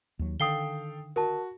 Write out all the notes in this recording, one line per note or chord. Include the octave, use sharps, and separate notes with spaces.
D#2 F#3
D3 D#3 A4 F5 G5 D#6 C7 G7
F#4 A#4 A5